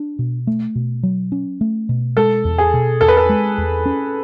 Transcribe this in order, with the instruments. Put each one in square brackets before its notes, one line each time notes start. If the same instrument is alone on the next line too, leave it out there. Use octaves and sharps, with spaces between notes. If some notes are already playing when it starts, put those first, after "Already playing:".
Already playing: [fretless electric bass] D4
B2
A3
B2
F#3
C#4
A3
B2
[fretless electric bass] G#3 [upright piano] A4
[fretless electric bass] E2
[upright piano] G#4
[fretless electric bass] B2
[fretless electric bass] E2 [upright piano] A4
[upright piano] B4
A4
[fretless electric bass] G#3
E2
C#4